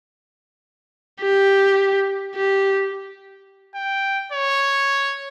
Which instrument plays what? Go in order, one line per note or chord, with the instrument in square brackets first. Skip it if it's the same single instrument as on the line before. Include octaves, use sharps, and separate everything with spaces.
[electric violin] G4
G4
[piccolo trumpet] G5
C#5